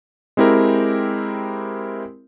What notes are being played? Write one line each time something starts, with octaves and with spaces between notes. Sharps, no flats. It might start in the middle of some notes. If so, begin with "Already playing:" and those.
G#3 C4 E4 G4 A#4